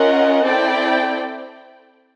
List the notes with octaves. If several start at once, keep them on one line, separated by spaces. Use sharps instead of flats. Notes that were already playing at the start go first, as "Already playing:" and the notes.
Already playing: C#4 F4 A#4 D#5 F#5
C4 E4 A4 D5 G5